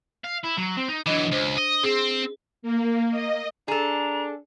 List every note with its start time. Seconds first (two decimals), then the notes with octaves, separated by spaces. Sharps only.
0.24 F5
0.43 E4
0.57 F#3
0.77 C4
0.89 D#4
1.07 E3 F#3 D4 D#5
1.32 C#2 C5
1.57 D#5
1.83 C4 G#4
2.62 A#3
3.11 D#5
3.68 D4 G#4 A4 A#5